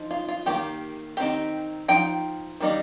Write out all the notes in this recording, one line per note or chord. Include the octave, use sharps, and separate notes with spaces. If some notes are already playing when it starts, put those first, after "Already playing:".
Already playing: F3 D#4
F4
F4
D#3 G3 A#3 G4
D#3 C4 D#4 G4
F3 D#4 G5
D#3 G3 A#3 D#4